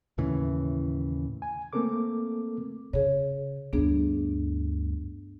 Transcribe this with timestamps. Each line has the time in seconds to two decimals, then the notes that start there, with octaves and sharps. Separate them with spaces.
0.18 D#2 A2 C#3 E3
1.42 G#5
1.73 A3 A#3 C4 A4 A#4 D6
2.93 C#3 G#4 C#5
3.73 D2 G2 B3 D4 G#4